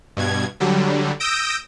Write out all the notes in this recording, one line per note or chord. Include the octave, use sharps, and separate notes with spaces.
G2 B2 G#6
D3 F#3 G3
D#6 E6 G6 A#6 D7